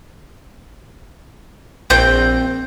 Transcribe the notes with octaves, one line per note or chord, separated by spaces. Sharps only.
A#1 C4 G5